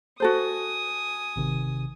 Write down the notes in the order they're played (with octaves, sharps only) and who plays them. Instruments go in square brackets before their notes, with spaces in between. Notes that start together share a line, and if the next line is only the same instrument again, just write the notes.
[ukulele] F#4 A4 C5 [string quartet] G#5 D#6
[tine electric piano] G#1 C3 D#3